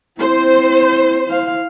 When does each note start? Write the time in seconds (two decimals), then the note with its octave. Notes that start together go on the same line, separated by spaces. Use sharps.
0.20 C4 E4 C5
1.28 E4 F5